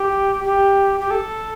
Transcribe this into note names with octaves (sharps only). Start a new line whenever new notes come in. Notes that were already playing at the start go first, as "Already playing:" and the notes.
Already playing: G4
G4
G4
A4